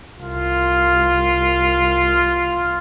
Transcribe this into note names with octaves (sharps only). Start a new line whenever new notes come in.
C2 F4